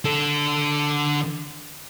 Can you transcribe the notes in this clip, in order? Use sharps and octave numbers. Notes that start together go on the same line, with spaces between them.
D3 A4